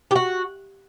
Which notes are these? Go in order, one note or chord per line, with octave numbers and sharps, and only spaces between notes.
G4
F#4